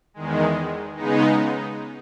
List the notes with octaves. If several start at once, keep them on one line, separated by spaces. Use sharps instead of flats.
E2 D#3 G#3
C#3 G#3 B3 D#4